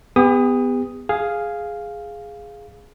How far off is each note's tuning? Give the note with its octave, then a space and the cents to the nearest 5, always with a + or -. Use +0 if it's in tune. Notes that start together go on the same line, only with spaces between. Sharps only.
B3 +15 G4 +45 D#6 +0
G#4 +0 F5 +0